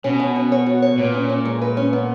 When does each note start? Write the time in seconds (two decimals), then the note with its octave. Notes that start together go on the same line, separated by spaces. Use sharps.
0.04 B2 C#4
0.20 F#4
0.36 C#4
0.52 C#5
0.67 F#4
0.82 C#5
0.98 A#2 B4
1.14 C#4
1.30 C#4
1.45 G#3
1.62 B4
1.77 C#4
1.93 B3